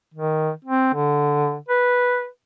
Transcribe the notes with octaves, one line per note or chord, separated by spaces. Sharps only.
D#3
C4
D3
B4